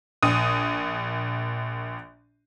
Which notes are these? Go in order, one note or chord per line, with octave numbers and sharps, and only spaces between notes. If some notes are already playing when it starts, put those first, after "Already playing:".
A#1 D#6